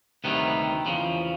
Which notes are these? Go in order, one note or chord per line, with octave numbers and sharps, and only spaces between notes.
D2 C3 D#3 G3 B3
E2 C#3 F3